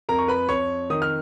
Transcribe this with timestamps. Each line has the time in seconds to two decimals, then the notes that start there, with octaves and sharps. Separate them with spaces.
0.09 F2 A#4 A#5
0.19 C#6
0.28 B4 B5
0.49 F2 C#5 C#6
0.90 D#3 D#6
1.02 F6